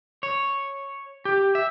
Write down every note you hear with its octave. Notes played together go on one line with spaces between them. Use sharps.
C#5
G4
E5